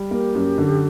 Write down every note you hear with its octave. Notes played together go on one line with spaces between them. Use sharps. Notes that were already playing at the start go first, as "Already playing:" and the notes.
Already playing: G3
A#3 G4
F#2
D3